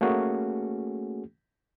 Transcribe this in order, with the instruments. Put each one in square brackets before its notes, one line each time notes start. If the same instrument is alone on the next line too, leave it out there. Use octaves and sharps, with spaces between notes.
[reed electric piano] A3 A#3 C#4 F#4 G#4